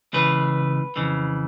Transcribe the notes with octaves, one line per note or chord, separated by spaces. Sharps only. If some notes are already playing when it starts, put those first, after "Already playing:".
C#2 C#3 E3 B4
F2 C#3 E3